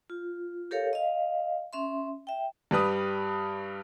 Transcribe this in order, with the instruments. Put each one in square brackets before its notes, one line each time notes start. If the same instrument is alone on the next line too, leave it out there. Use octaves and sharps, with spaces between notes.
[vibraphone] F4
G4 A4 A#4 C#5 F5
D#5 F5
C#4 E5 C6
E5 G5
[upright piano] G2 G3 B4 D#6